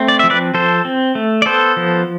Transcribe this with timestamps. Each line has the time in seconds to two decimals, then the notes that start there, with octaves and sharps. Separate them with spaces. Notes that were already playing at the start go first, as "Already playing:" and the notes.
Already playing: A3 C4
0.08 D5
0.19 F3 E5
0.30 B4 D5
0.54 F3 A4 C5
0.85 C4
1.15 A3
1.42 D5
1.46 B3 A4 C5
1.77 F3